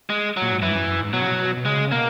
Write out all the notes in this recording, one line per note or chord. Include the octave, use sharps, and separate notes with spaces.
G#3
A#2 F#3
G#2
F#2 E3
G#2
F#2
F#2
G#2
B2 F#3
C#3
B2
B2
C#3 G#3
C#3
B2 A#3